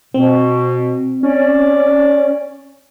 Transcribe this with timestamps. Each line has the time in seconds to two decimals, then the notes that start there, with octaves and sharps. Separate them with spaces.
0.14 B2 C4
1.23 C#4 D5